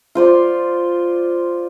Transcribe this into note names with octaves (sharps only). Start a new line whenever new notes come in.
F4 C5 D5